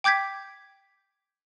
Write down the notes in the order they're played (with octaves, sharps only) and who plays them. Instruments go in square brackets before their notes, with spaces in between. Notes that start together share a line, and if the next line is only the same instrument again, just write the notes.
[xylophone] G5 D6 G6 G#6 B6